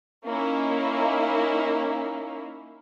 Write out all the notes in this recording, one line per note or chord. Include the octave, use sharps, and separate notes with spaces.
A#3 C#4 D#4 E4